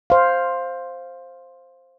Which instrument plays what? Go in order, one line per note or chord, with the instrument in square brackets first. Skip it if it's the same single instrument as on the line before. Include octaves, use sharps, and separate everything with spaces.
[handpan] C5 F5